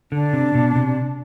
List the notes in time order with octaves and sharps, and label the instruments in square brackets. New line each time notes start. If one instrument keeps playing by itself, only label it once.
[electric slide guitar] D3 [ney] D4
[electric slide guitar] C3
B2
C3